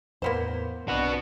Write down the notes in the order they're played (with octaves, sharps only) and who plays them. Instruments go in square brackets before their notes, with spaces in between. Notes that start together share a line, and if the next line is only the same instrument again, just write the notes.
[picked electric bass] E2 A2 [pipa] A#3 B3 C5
[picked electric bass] B1 C4 [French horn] D4 [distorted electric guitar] F#4 B4